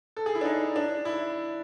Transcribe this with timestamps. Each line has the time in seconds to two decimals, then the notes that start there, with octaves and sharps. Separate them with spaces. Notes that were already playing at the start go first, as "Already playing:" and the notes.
0.17 A4
0.26 G#4
0.35 E4
0.41 D4
0.45 D#4
0.76 D4
1.05 E4